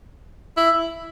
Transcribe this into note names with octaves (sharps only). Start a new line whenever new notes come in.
E4